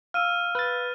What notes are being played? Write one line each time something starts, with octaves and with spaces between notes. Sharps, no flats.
F5 E6 F6 D#7
B4 A6